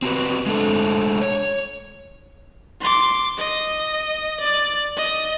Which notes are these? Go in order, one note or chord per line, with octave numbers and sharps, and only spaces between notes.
C4 F#4 G4 B4
G#3 A3 D4 A4
C#5
C6 D6
D#5
D5
D#5